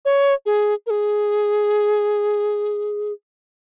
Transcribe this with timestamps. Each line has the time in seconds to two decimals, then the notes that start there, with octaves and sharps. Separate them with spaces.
0.05 C#5
0.46 G#4
0.87 A#4
0.90 G#4